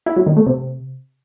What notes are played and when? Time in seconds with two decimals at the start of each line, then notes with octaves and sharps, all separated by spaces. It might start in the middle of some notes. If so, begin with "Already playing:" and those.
0.06 E4
0.16 F#3
0.26 D#3
0.36 A3
0.46 C3